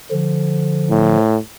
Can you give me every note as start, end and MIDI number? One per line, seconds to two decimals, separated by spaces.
0.11 1.16 50
0.11 1.16 53
0.90 1.38 45